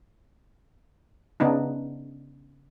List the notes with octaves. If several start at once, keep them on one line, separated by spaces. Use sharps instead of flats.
C#3 B3 D4 D#4